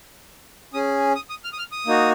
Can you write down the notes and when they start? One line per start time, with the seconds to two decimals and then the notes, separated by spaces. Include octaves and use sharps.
0.74 C#4 G#4 D#6
1.15 D#6
1.30 D#6
1.44 F6
1.53 D#6
1.59 F6
1.72 D#6
1.86 A#3 D#4 F#4